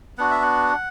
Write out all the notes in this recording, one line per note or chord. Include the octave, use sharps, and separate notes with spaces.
B3 D4 F#4 F#5
E5
F#5